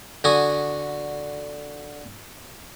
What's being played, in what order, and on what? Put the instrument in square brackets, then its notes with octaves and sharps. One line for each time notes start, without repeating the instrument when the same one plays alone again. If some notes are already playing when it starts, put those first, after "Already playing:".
[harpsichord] D3 F#4 G#5 D#6